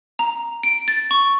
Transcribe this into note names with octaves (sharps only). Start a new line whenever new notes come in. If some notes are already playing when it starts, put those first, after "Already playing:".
A#5
D7
A6
C#6